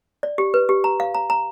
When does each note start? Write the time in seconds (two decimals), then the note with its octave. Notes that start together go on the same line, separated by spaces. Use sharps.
0.23 D5
0.38 G4
0.54 B4
0.69 G4
0.84 A#5
1.00 F5
1.15 A#5
1.30 A#5